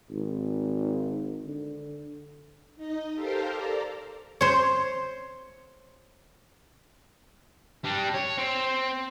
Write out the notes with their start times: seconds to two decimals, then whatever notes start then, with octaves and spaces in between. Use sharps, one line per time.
0.11 G#1
1.46 D3
2.76 D#4 D#5
3.14 G4 A4 A#4 C5 F5
3.49 A4 D5 A#5
4.41 C5 C#5
7.85 G3 D4
8.14 C#5
8.38 C4